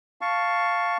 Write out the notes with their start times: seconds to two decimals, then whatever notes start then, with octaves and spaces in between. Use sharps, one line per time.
0.21 F5 A5 C#6